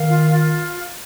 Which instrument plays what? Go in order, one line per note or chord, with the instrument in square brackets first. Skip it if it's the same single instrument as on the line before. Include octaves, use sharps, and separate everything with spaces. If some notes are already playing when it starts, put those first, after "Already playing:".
Already playing: [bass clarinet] D#3 [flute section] F5
[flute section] F4
F4